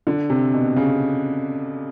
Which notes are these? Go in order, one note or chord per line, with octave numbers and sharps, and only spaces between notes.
D3
C3
B2
C#3